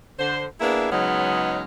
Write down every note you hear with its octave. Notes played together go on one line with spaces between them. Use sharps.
D3 C5
A#3 B3 D4 E4 G#4
C#3 F#3 G#3 B3 C#4 D#4